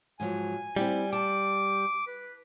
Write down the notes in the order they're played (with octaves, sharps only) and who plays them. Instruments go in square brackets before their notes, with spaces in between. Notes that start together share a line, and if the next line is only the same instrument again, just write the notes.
[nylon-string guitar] G#2 F3 F#3 [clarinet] G#5
[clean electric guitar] G3 [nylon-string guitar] C4 E4 G4
[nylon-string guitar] A5 [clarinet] D6
[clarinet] B4